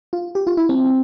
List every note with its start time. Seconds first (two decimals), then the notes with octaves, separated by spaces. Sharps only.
0.13 F4
0.35 G4
0.47 F4
0.57 E4
0.69 C4